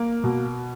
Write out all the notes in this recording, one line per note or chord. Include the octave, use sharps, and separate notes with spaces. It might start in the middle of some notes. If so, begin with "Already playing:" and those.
Already playing: A#3
B2